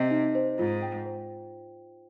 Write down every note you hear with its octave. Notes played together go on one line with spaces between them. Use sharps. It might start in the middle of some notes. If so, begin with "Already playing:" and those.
Already playing: C3 G4 D#5
D#4
C5
G#2 F4
G5
C5